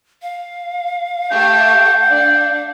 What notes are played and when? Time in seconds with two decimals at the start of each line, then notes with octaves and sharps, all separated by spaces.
0.22 F5
1.31 A3 G4 G5
2.11 D4